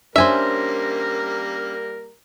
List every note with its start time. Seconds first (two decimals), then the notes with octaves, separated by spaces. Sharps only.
0.16 G3 A#3 C#4 D4 A#4 C5 E5 G#5